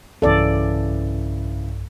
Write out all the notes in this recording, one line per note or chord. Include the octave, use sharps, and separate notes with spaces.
B1 G2 C#3 E3 A4 D5